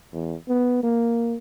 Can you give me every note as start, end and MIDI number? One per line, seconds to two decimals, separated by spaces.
0.13 0.35 40
0.49 0.78 59
0.83 1.37 58